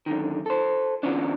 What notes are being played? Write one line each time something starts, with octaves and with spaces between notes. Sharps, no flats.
F#2 D3 D#3
A4 C5
D#3 F3 B3 C#4 D4